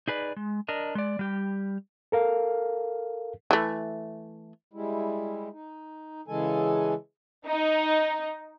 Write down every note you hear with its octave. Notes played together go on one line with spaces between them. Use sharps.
D#4 G#4 B4 D5
G#3
D4 A#4 D#5
G#3 D5
G3 G4
A4 A#4 F5
E3 A3
G3 G#3 E4
D#4
C#3 E3 G#3 A4 G#5
D#4